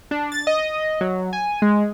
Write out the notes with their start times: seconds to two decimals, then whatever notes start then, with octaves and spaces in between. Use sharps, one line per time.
0.11 D4
0.32 A6
0.47 D#5
1.01 F#3
1.33 G#5
1.62 G#3